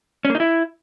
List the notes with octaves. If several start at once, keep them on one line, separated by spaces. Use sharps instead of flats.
C#4
A#3
D#4
E4